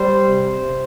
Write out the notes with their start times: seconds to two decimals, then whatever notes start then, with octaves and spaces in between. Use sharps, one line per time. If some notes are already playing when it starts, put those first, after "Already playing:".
Already playing: G3 C5
0.25 C3
0.60 C3